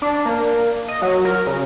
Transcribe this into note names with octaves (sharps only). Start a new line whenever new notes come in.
D4
A#3
D#5
F#3
A#4
C#3